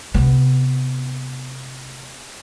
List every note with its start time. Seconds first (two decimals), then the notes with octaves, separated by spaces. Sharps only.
0.14 C3 B3